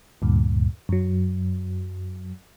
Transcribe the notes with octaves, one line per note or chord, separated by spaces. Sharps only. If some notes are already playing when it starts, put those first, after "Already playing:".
D2 G2 A#2
F#2 F#3